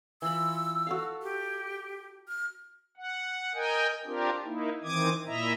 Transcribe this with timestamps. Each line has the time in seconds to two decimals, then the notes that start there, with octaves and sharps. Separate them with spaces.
0.22 E3 F4 B5 E6
0.87 F#4 A4 F5
1.22 G4
2.28 F6
2.97 F#5
3.54 A#4 D#5 G5 G#5
4.06 C4 D4 F4 G4 A#4
4.45 A#3 D#4 E4
4.84 D#3 E3 C4 D6 D#6 G#6
5.26 A#2 E4 D#5 E5 A#5